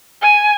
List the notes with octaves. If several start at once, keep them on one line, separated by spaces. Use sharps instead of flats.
G#5